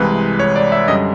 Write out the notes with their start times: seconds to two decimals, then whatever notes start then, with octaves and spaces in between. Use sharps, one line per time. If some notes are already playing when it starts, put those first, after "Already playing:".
Already playing: C2 C3 E3 G#3 B4
0.40 C#5
0.56 D5
0.72 E5
0.88 F#2 D3 G3 D#5